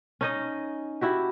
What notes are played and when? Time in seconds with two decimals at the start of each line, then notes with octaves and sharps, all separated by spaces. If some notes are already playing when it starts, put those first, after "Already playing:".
0.21 C#4 D#4 D#5
1.01 E4 F#4 G4